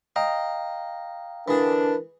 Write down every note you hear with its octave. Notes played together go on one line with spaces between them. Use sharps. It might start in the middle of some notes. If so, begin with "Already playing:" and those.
D#5 F5 G5 A#5
D3 E3 D4 G#4 A#4